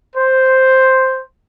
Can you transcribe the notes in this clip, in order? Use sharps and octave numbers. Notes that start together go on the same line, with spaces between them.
C5